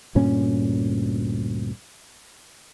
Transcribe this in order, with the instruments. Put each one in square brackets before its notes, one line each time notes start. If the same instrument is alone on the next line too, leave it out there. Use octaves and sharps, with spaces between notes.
[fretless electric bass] D2 G2 A#2 C#4